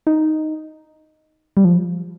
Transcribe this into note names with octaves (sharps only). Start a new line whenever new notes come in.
D#4
G3
F3